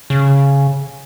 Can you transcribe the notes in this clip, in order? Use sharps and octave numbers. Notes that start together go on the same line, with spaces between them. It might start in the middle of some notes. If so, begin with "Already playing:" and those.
C#3